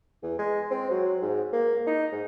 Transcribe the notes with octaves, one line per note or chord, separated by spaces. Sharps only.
E2
G#3
C4
F#3
G#2
A#3
D#4
G#2